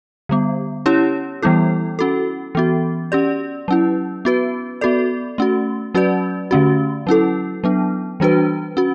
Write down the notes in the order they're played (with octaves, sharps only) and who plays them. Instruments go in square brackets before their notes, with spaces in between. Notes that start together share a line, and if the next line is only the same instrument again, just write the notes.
[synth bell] D3 G3 B3
C#4 E4 G4 C#5
E3 G3 B3 E4 A4
C#4 F#4 A4
E3 B3 F#4
C#4 G4 D5
F#3 C#4 E4
B3 F#4 B4
B3 F#4 A4 D5
A3 C#4 F#4
F#3 C#4 F#4 B4 D5
D3 A3 C#4 F#4
F#3 C#4 E4 A4
F#3 B3 D4
E3 G3 D4 F#4 B4
C#4 F#4